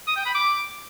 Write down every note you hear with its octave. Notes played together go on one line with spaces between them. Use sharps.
D#6
G5
B5
D6